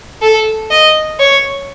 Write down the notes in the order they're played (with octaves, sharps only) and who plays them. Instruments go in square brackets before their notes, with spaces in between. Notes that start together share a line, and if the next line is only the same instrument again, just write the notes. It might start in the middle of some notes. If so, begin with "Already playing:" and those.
[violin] A4
D#5
C#5